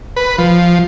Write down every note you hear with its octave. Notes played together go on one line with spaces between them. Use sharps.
B4
F3